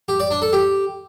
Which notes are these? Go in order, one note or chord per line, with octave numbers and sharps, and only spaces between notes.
G4
D5
D4
A4
G4